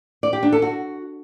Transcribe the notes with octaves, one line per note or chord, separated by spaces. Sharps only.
D5
G4
D4
A4
F#4